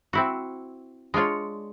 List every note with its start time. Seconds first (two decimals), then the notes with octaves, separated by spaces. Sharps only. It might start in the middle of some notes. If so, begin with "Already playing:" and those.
0.13 C4 E4 F#4
1.14 G#3 D4 F4 C#5